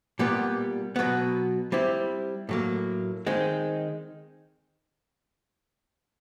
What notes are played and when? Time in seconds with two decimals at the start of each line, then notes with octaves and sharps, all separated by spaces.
0.19 A#2 G3 B3
0.96 B2 F#3 B3
1.72 G3 C4 E4
2.49 A2 F#3 A#3
3.27 D#3 G#3 C4